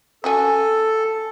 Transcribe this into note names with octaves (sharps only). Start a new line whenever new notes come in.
C#4 F#4 A4 G#5